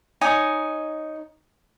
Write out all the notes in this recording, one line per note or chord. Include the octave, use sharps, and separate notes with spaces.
D#4 C#5 G#5 D#6